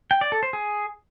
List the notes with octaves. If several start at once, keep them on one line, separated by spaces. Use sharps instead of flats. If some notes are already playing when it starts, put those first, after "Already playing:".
G5
D5
A4
C5
G#4